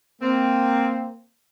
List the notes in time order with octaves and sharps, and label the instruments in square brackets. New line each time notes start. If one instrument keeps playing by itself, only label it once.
[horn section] A#3 C4